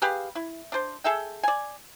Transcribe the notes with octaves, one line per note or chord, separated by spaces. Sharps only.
G4 G#4 B4 F5
E4
D4 C5
G#4 A4 E5 G5
D5 G#5